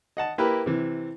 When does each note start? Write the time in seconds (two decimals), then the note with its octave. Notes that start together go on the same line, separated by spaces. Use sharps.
0.17 D#5 F#5 A5
0.38 A#3 E4 G4 A#4 B4
0.66 C3 E3